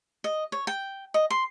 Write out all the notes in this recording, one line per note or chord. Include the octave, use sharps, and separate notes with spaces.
D#5
C#5
G5
D#5
C6